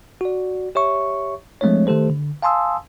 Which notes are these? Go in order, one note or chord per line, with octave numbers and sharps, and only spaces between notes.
F#4 D5
G4 C#5 E5 C#6
F3 G#3 A3 C4 D4 C#5
D#3 A3 G4 A4 C5
D3
F5 G#5 A5 C6 D#6 E6